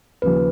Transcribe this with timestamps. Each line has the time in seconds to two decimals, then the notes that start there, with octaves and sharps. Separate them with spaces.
0.22 D#2 C#3 F3 B4